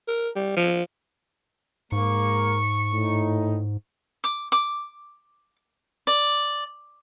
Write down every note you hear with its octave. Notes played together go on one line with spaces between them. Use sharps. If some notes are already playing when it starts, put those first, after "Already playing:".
A#4
G3
F3
G#2 G#3 A#3 C#6
A2 D#4
D6
D6
D5